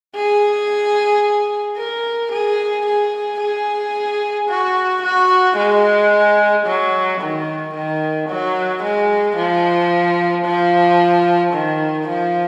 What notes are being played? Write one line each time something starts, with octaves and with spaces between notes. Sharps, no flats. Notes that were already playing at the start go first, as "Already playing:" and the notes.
G#4
A#4
G#4
G#4
G#4
F#4
F#4
G#3
F#3
D#3
D#3
F#3
G#3
F3
F3
D#3
F3